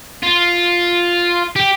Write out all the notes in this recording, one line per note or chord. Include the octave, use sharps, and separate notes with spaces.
F4
G4